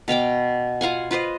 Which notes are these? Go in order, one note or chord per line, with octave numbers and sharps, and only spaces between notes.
B2 F5 G5 D6
F4 F5 F#5 G#5
F4 B4 C5 D#5